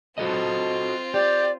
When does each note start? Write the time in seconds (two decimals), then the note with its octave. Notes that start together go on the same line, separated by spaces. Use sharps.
0.18 C4 F4 F#4 A4 D#5
1.14 G4 D5